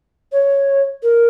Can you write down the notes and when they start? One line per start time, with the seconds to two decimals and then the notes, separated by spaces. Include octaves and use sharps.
0.32 C#5
1.03 A#4